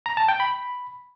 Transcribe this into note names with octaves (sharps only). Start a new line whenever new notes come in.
A#5
A5
G5
B5